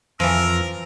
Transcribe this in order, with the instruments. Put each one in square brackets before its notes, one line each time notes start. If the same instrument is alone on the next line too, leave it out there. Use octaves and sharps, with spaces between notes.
[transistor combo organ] F2 [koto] E3 F3 [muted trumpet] A#4 [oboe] E6